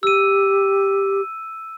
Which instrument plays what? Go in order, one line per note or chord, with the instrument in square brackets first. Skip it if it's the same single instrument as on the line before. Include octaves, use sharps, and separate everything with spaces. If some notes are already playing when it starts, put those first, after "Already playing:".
[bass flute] G4 [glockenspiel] E6 D#7